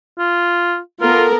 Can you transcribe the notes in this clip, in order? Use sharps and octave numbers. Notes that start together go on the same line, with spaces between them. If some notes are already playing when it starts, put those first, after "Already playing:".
F4
B3 F4 A4 A#4